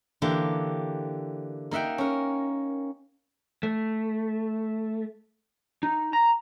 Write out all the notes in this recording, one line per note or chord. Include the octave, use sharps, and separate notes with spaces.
D3 E3 A#3 G4
A#3 D#4 E5 F#5 G5
C#4 A#4
A3
D#4
A#5